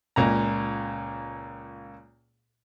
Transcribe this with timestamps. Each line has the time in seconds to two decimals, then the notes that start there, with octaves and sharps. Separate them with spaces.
0.16 C#2 A#2 A#5